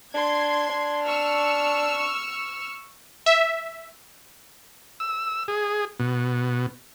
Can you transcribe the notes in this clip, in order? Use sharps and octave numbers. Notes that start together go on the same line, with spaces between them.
D4 C6 G#6
D4
C#6 E6 F6
E5
E6
G#4
B2